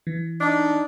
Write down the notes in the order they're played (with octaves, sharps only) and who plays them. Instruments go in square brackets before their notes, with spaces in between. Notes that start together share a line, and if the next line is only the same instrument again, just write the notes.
[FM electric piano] E3
[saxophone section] D4 D#4